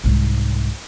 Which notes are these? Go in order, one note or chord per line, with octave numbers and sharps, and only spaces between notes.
C2 G#2